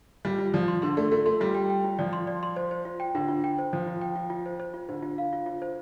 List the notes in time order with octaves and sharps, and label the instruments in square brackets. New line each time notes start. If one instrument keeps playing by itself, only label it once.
[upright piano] G3 [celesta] F4
[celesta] F4
[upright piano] F3 [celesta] D5
[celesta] C6
[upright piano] D3 [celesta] C6
[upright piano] A3 [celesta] D5
[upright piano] A3 [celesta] F4
[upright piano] A3 [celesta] C6
[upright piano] G3 [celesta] F4
[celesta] G5
G5
F4
[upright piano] F3 [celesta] D5
[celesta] C6
D5
C6
C5
C5
F4
G5
[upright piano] D3 [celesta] F4
[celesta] F4
G5
C5
[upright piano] F3 [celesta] C5
[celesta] F4
G5
F4
F4
C5
C5
F4
[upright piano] D3 [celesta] C5
[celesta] F4
F5
F4
F4
C5